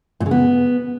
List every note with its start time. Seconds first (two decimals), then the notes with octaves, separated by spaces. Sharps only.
0.20 A#2
0.26 C#3
0.31 B3